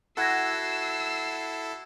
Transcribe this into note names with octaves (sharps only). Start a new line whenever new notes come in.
E4 F#4 A4 E6 F#6 G#6 A#6 C7